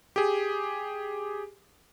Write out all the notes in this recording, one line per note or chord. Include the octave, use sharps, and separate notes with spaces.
G4 G#4